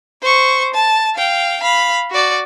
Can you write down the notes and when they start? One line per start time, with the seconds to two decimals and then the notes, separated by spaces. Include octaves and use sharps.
0.22 C5 C#6
0.74 A5
1.16 F5 G5
1.61 F5 B5
2.11 F#4 D5